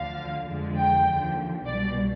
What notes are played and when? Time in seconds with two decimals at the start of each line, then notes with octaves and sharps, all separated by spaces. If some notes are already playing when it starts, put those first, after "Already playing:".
Already playing: D2 D3 F3 F5
0.48 F2 D3 F3 G#3
0.77 G5
1.07 D#2 D3 F3
1.65 C2 B2 G3 D5